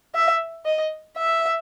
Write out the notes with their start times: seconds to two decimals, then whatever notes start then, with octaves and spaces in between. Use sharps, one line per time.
0.15 E5
0.66 D#5
1.17 E5